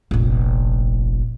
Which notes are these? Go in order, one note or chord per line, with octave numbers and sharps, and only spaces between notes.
F1 A#1